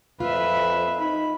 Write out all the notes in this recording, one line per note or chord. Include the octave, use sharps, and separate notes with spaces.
F2 F4 B4 E5
D#4 B5